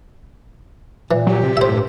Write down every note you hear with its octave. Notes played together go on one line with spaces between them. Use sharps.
A#2 E3
F#3 G4
C3
A2 C3 C5 E5
G2